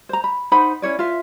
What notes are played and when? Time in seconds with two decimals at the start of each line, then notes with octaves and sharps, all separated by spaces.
0.09 C5 A#5
0.24 B5
0.52 D#4 C5 F#5 B5
0.82 C#4 E4 C#5 D5
0.99 F4 C5 E5